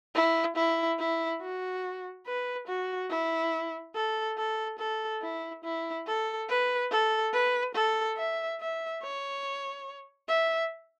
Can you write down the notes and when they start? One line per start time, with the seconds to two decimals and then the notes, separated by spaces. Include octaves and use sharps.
0.15 E4
0.56 E4
0.99 E4
1.41 F#4
2.26 B4
2.68 F#4
3.10 E4
3.95 A4
4.37 A4
4.79 A4
5.22 E4
5.64 E4
6.07 A4
6.49 B4
6.91 A4
7.33 B4
7.75 A4
8.17 E5
8.60 E5
9.03 C#5
10.28 E5